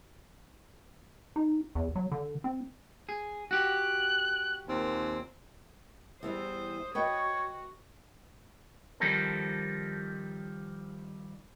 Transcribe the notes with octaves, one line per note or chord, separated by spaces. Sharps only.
D#4
E2
F#3
D3
C4
G#4
F#4 G4 F#6
D#2 A#2 C4
E2 E3 G3 C5 D#6
F#4 B4 C#5 D#5 G5
D#3 F3 G3 C4 A4 A#4